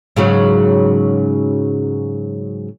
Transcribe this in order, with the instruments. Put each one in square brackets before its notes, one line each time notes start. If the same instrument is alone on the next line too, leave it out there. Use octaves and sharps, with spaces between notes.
[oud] G#2 C#3 F#3